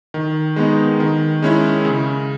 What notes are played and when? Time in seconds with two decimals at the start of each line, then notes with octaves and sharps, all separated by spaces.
0.14 D#3
0.56 G#3 B3 D#4
1.00 D#3
1.42 G#3 C#4 E4
1.85 C#3